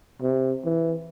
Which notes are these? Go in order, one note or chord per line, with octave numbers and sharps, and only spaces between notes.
C3
E3